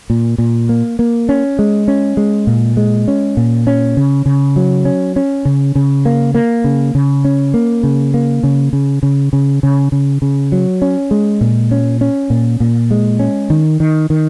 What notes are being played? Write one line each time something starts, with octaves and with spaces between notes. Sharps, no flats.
A#2
A#2
A#3
A#3
C#4
G#3
C#4
G#3
A#2
G#3
C#4
A#2
C#4
C#3
C#3
F#3
C#4
C#4
C#3
C#3
A#3
A#3
C#3
C#3
C#4
A#3
C#3
A#3
C#3
C#3
C#3
C#3
C#3
C#3
C#3
F#3
C#4
G#3
A#2
C#4
C#4
A#2
A#2
G#3
C#4
D#3
D#3
D#3